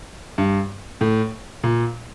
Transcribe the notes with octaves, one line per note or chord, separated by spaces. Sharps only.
G2
A2
A#2